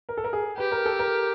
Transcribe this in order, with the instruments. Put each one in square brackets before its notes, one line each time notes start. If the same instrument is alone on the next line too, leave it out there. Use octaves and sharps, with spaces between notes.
[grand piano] A#4
A4
A#4
G#4
[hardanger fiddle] G4 [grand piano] B4
[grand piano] A#4
A4
A#4